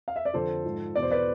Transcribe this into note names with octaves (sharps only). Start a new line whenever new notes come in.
F5
E5
D5
F2 D3 F3 A4 C5
G#2 F3
E2 B2 D5
C5
B4 D5